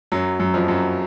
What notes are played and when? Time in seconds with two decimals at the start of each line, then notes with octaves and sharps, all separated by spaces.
0.12 F#2 F#3
0.39 F#2 F#3
0.54 F2 F3
0.68 F#2 F#3